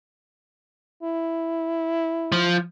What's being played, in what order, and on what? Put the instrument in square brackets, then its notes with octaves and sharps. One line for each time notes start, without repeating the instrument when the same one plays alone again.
[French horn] E4
[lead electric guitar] F3